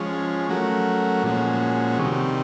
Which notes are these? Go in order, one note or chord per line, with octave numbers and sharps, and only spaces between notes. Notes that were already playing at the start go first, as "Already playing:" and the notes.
Already playing: F3 G#3 C#4
F#3 A3 C#4 F#4 A#4
A#2 F3 G#3 C#4 F#4
C3 D#3 G3